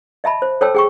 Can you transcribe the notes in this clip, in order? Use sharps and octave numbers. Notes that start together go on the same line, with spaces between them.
D#5 E5 A5 B5
C5
A4 C5 C#5 G5 A5 E6
G#4 G5 C#6